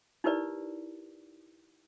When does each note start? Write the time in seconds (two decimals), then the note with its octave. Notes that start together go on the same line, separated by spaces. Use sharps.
0.24 D#4 E4 G4 A#4 B4 D5